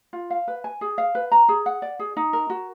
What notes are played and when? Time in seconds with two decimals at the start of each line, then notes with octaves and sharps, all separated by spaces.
0.13 F4
0.30 F5
0.48 B4
0.64 G#5
0.81 G#4
0.98 F5
1.15 B4
1.32 A#5
1.49 G#4
1.66 F#5
1.82 D5
1.99 G#4
2.17 D#4
2.33 A#4
2.50 F#4